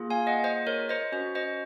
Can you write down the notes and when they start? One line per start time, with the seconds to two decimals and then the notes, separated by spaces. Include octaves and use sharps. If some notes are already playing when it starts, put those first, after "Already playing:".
Already playing: A#3 F4 G#4
0.10 F5 G#5
0.27 D#5 F#5
0.44 C5 D#5
0.67 A#4 C#5
0.89 C5 D#5
1.12 C#4 F#4 C5
1.35 C5 D#5